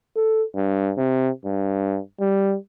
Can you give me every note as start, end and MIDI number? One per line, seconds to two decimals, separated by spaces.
0.16 0.44 69
0.56 0.92 43
0.97 1.29 48
1.45 1.99 43
2.20 2.56 55